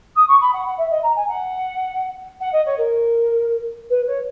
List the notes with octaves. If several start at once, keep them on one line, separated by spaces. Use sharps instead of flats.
D#6
C#6
B5
F#5
F#5
E5
D#5
A#5
G#5
F#5
F#5
D#5
C#5
A#4
B4
C#5